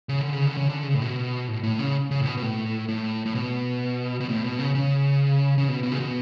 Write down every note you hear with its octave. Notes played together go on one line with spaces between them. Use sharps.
C#3
D3
C#3
D3
C#3
D3
C#3
A2
B2
A2
A2
C#3
C#3
A2
B2
B2
A2
A2
A2
B2
B2
A2
B2
C#3
C#3
C#3
B2
B2
C#3
B2